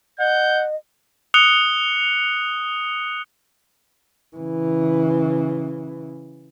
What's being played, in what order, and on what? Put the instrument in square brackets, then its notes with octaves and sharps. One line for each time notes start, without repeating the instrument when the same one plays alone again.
[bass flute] D#5 [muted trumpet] F#5 [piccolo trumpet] G6
[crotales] D#6 F#6 C#7 F7 G7
[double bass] C#3 E3